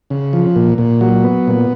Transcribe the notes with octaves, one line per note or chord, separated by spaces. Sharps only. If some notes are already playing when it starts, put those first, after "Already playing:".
C#3
F3
A#2
A#2
F#3
B3
A#2